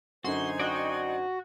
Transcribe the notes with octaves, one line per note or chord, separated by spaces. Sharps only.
F#2 D3 D#4 F#4 C5 G#5 C6
F#4 D5 D#5 G5